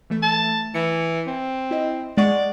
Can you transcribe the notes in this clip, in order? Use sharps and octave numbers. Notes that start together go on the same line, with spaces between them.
E3 A3 E5
A5
E3 C#7
C4
E4 D#5
G#3 D5 F#5 C#6